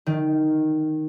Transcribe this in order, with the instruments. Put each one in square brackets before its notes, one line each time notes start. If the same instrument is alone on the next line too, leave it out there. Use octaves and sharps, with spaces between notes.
[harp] D#3